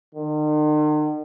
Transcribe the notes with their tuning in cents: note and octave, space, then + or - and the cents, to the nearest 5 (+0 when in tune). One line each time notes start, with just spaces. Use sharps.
D#3 -45